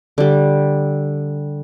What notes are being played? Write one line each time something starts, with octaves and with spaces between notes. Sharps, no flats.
D3 G3